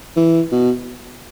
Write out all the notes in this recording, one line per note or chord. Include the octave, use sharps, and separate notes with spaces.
E3
B2